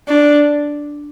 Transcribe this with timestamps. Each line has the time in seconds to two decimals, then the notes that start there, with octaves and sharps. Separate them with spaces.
0.08 D4